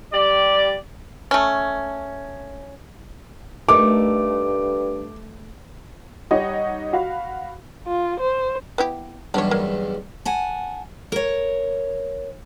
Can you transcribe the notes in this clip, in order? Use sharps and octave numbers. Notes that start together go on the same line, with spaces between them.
G3 G4 D5
A3 C#4
G2 A3 D#4 A#4 D6
G3 D#4 C#5 D#5 F#5
F#4 F5 B5
F4
C5
B3 E4 G4
B1 E2 G2 D4 C#5
A#3
F#5 G#5 A5
A#4 C#5